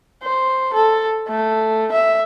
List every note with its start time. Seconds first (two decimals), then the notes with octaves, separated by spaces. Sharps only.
0.24 C5
0.74 A4
1.28 A3
1.93 E5